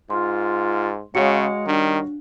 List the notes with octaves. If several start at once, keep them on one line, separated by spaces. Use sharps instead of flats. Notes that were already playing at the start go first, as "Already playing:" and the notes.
G#2 F4 C6
C#3 G#3 F#4 C#5 F5 C#7
D#3 G3 D4